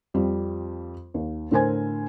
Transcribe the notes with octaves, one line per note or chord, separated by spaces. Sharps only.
F2 G3 F4
D#2
A2 D3 A#4 C5 G#5 G#6